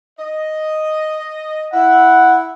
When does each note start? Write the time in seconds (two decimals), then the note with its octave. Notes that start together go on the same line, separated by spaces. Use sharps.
0.19 D#5
1.74 E4 F#5